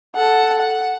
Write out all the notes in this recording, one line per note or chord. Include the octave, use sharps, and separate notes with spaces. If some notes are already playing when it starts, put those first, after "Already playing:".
A4 F#5
F#5